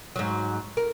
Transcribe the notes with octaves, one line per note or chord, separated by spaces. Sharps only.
G#2 F#3
A#4